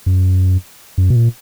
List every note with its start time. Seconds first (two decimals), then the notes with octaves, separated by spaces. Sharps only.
0.06 F#2
0.98 F#2
1.10 B2
1.16 A#2